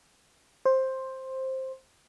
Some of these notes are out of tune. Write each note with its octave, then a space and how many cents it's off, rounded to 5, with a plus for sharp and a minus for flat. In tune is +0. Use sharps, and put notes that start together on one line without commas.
C5 +10